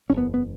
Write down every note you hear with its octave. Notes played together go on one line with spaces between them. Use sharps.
F#1 E2 C#3 C#4
B3
B3